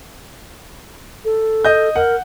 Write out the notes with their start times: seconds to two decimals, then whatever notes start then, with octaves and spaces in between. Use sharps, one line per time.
1.25 A4
1.65 D#5 G6
1.96 A#4 F#5